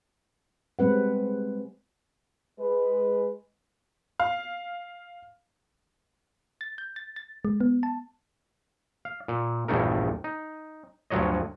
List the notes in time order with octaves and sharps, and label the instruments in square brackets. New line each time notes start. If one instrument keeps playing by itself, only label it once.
[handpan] G3 G#3 C4 B4 F#5
[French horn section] G#3 B4
[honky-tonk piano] F5
[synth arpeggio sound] A6
G6
A6
A6
G#3
B3
A5
[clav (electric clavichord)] F5
A#2
A#1 E2 G2 A3 D#4 A#4
D#4
D2 G2 F3 F#3 C#5 D#5